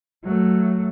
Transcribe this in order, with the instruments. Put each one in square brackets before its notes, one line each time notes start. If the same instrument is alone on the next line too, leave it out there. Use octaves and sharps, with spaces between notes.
[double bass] F#3 A3